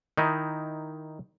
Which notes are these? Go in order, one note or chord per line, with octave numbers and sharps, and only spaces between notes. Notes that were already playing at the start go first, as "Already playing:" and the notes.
D#3 D#4 E4